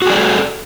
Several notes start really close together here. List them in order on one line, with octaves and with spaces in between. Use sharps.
F#4 G#4 D5 A4